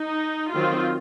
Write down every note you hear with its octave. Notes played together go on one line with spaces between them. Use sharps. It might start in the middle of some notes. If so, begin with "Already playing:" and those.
Already playing: D#4
D#3 F#3 C4 F4